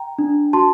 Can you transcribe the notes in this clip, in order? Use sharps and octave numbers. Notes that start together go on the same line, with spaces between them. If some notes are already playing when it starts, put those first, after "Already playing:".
Already playing: G5 A#5
D4
F#4 A5 C6